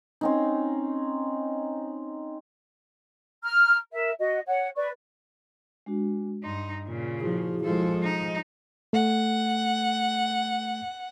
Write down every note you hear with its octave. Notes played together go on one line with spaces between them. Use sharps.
C4 C#4 D#4
A#5 F6
A#4 E5
F#4 D#5
C#5 F#5
B4 D5 C#6
G#3 D4 F#4
G2 D#4 C6
A#2 C#3 F4
F3 E4 F#4 G#4
F3 G#3 A4
D#4 D#5
A3 F#5